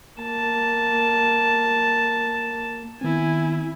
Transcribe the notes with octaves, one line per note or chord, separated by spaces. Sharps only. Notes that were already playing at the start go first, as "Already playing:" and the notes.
A#3 A5
D#3 B3 C4 E4 G#5